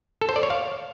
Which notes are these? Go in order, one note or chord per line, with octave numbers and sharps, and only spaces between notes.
A4
C5
D5
C#5
F5